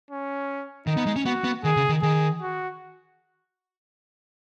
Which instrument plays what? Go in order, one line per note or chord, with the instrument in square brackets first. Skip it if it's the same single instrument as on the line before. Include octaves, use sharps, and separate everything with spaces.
[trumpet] C#4
[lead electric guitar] D#3 [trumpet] D#4
[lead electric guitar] B3
G#3
C#4
[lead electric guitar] B3 [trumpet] F#4
[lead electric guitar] B3
[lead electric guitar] D#3 [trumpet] G#4
[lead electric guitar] C#3
D#3
[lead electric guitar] D#3 [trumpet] G#4
[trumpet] F#4